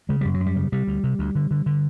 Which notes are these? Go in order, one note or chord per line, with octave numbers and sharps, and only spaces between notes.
C#3 G#3
F#2 G3
F#3
F#2
G3
C#3
C3 G3
D2
C3
D2
D3
D3
D3